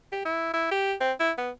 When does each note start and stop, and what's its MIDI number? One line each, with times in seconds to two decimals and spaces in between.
0.12 0.24 67
0.25 0.53 64
0.54 0.67 64
0.71 0.94 67
1.00 1.13 60
1.20 1.32 64
1.38 1.51 59